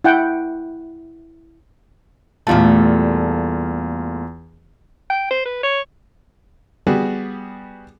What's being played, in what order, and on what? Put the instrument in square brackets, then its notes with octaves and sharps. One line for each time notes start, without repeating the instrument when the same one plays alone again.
[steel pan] E4 F#5 G5
[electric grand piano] E2 F4 A5 [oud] A#2 G3 A3
[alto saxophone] G5
C5
B4
C#5
[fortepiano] G3 B3 F#4 G#4